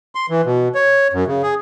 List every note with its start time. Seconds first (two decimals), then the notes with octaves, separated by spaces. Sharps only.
0.15 C6
0.30 E3
0.45 B2
0.75 C#5
1.13 F#2
1.27 C#3
1.42 G#4